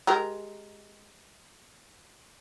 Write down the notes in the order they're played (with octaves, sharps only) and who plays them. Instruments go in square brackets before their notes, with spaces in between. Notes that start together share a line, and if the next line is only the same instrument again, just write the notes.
[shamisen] G#3 G4 A#4